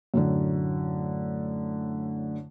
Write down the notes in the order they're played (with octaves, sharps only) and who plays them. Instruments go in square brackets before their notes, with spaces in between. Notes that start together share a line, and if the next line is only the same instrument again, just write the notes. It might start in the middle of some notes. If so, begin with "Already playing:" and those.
[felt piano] F#2 A2 D3